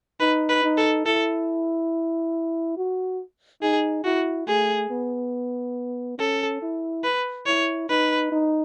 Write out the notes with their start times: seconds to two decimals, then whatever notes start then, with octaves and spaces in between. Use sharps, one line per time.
0.20 D#4 B4
0.49 B4
0.64 D#4
0.77 A4
1.05 E4 A4
2.77 F#4
3.62 D#4 G#4
4.05 E4 F#4
4.48 A3 G#4
4.90 B3
6.18 C#4 A4
6.62 E4
7.04 B4
7.46 E4 C#5
7.89 D#4 B4
8.32 D#4